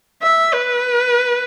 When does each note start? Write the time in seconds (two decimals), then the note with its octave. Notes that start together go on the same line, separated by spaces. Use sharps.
0.22 E5
0.54 B4